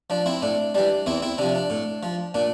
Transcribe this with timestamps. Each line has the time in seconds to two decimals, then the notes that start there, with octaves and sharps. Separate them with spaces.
0.10 F3 D4
0.26 C4 E4
0.42 A2 D4
0.75 E3 G3 D4
1.06 E2 C4 E4
1.22 C4 E4
1.38 C3 F3 D4
1.55 D4
1.70 A2
2.03 F3
2.34 A#2 D4